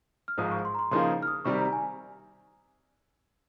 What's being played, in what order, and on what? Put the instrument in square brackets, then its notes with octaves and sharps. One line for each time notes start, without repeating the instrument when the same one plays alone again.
[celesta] F6
[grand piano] G#1 G#2 F3 G#3 [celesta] D#6
[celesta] C#6
C6
A#5
C6
[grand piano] C#3 F3 A#3 D#4 G#4 [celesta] C6
[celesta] F6
D#6
[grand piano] C3 D#3 G3 [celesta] C#6
[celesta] A#5
G#5